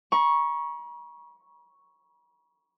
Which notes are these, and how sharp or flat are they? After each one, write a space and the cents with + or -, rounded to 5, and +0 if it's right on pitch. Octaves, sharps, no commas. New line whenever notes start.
A#5 +45 C#6 +0